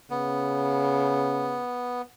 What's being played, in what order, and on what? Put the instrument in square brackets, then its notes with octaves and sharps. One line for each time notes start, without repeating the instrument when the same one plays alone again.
[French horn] C#3 [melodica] B3